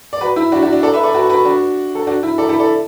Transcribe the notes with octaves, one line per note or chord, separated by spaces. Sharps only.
D5
F#4 B4
E4
D4 F#4
D4 F#4
D4
A4 D5
B4 E5
A4 D5
F#4 B4
F#4 B4
D4 F#4
A4
D4 F#4
E4
A4 D5
E4 A4
A4 D5